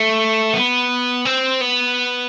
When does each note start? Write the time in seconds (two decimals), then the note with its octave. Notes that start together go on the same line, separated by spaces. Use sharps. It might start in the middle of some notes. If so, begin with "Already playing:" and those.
Already playing: A3
0.54 B3
1.25 C4
1.61 B3